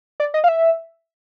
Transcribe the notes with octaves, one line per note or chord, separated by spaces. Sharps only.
D5
D#5
F5
E5